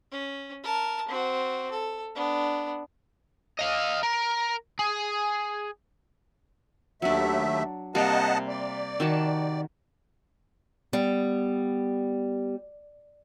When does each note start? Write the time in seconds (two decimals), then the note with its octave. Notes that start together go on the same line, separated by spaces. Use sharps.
0.12 C#4
0.63 A#4 A5
1.08 C4 F#4
1.71 A4
2.15 B3 D4
3.59 D#5 F5
4.03 A#4
4.79 G#4
7.02 D#2 F#3 A3 D4 E5
7.95 C3 G3 A#3 D#5 F#5 A5
8.48 D5
9.00 D#3 F#4 A5
10.93 G3 B3